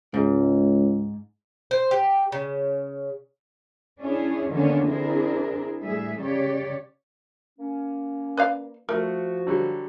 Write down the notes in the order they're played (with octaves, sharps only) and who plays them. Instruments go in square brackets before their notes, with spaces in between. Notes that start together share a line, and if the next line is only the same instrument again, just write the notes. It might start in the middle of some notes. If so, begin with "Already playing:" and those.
[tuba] C#2 [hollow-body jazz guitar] G#2
[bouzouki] C5
G4
C#3
[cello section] C#4 D4 E4 G#4
D3 D#3 A#3 B3 C#4 D4
C4 D4 E4 G#4 A#4
A2 G3 G#4 E5
C#3 G4 C#5 D5
[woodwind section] A#3 C#4
[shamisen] B4 D5 F5
[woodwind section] F3 F#4 [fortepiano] A3 [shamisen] A#4
[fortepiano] D3 F#3 G3